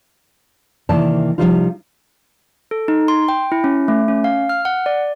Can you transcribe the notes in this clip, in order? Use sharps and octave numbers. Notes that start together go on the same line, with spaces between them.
C3 D#3 E3 A#3 D5 A5
C3 E3 F3 G3 D#4 F4
A4
D#4
C6
G5
E4
C#4
A3
C#4
F5
F6
F#5
D5